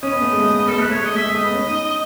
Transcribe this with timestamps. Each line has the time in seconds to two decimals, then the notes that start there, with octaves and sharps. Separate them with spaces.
0.02 C#4 D#5
0.12 B3
0.22 A3
0.31 G#3
0.39 A3
0.50 A3
0.59 B3
0.68 G#3 A4
0.78 A3 B4
0.90 A3 C#5
1.03 G#3 D#5
1.15 A3 E5
1.24 G#3
1.34 A3 D#5
1.44 B3
1.54 C#4
1.66 D#4
1.79 D#4